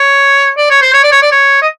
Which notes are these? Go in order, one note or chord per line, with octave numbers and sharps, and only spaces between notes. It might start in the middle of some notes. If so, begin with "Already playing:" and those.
Already playing: C#5
D5
C#5
C5
C#5
D5
C#5
D5
C#5
D#5